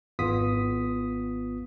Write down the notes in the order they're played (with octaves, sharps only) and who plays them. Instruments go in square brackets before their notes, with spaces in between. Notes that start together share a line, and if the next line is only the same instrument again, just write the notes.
[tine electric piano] G#1 B3 F4 D#6 B6